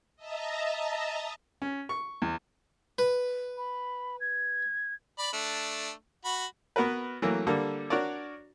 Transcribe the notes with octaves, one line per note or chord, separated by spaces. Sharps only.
D#5 E5 A5 A#5
C#4
C#6
E2
B4
B5
G#6
D5 B5
A3 D4
F#4 B5
B3 F#4 A#4 B4
E3 F#3 A3 A#3
D3 G3 A#3 A4
D4 F#4 A#4 C#5 D5